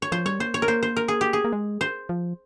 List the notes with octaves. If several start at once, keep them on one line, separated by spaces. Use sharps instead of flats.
C#5
F3 C5
G3 C#5
A#3 C5
C#5
A#4
A#3 C5
C5
A#4
G#4
G4
G#4
A#3
G#3
C5
F3